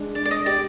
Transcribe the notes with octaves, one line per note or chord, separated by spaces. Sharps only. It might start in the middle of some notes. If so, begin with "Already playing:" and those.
Already playing: G#3 D4
D4 D5
D5
D#5
G4 D5